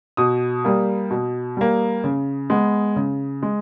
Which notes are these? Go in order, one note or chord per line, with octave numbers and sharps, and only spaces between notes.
B2 D#6
G3 A#3
B2
G3 A#3
C#3
G#3 B3
C#3
G#3